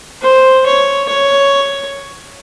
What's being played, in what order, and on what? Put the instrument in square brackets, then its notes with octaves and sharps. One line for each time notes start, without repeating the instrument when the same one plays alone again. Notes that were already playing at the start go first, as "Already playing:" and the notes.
[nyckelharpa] C5
C#5
C#5